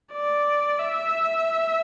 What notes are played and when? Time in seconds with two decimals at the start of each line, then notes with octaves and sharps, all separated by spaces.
0.13 D5
0.79 E5